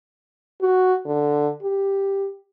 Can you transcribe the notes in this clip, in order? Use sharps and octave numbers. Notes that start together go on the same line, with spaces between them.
F#4
D3
G4